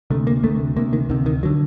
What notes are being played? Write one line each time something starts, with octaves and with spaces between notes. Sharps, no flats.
D2 C3 A3
A#3
D2 C3 A3
D2 C3 A#3
D#3
D2 C3 D#3
D#3
D3 F#3